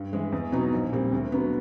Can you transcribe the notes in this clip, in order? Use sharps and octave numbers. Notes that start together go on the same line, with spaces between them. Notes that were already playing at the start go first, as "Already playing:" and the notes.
Already playing: G2
E3 G#3
E2
B2 F#3 B3 D#4
A#1
A#2 G3 C4
D2
D3 F#3 B3